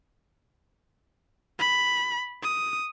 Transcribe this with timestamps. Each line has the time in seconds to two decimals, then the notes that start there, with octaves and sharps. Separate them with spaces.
1.59 B5
2.42 D#6